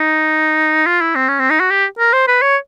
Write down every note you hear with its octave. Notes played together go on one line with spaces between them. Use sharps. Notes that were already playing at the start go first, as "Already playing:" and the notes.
Already playing: D#4
F4
E4
C4
C#4
C4
D#4
F#4
G4
A#4
C5
B4
C#5